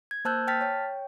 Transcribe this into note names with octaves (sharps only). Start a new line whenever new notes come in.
G#6
A#3 C5 A5 E6 F#6 G6
G5 A5 F6 A6 B6
C#5 G5